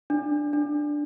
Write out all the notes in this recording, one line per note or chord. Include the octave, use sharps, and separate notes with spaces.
D4
D4